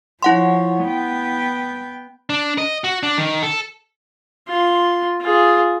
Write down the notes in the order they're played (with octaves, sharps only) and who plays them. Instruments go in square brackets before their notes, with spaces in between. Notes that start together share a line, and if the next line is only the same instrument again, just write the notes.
[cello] F3 C#5 [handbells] E4 F#5 C6
[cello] B3 G5
[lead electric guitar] D4
D#5
F#4
D4
D#3
A4
[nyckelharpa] F4 C6
F4 G#4